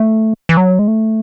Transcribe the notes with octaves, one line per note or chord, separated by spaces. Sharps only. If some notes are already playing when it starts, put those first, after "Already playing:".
Already playing: A3
E3
F#3
G#3
A3